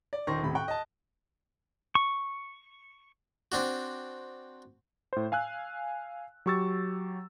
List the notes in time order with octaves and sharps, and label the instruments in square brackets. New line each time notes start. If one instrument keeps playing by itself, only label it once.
[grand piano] D5
D#1 D#3 C5 C6 C#6 A#6
D#1 A2 C3 B5
G5 C#6 F#6
D#5 A5
[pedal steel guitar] C#6
[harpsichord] C4 D4 F#4
[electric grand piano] A2 C5
F5 G#5 E6 F#6
F#3 G4 C#6 E6 A6